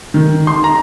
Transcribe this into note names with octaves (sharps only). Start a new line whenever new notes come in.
D#3
C6
A#5